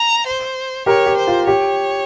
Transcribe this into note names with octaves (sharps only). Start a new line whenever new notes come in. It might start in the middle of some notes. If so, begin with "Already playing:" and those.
Already playing: A#5
C5
G4 A#4 C#5
G4
C5
F4
G4 C#5